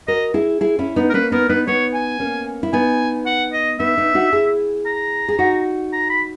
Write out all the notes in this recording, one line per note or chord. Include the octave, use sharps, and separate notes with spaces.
F#4 A#4 D#5
E4 G#4
E4 G#4
C#4 E4
B3 D#4
A#4
A#3 C#4 B4
B3 D#4 A#4
B3 D#4 B4
B3 D#4 C#5
G#5
A#3 C#4
E4
B3 D#4 G#5
F#5
D#5
B3 D#4 E5
B3 D#4
D#4 F#4
E4 G#4
A#5
G#4
D#4 F#4
A#5
B5